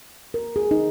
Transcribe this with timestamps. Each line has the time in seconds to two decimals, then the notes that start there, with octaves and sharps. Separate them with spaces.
0.34 A#4
0.56 G#4
0.71 D#4